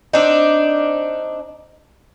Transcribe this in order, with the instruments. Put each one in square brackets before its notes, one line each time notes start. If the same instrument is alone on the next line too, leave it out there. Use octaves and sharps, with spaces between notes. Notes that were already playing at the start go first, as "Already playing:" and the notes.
[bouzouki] C4 D4 D#4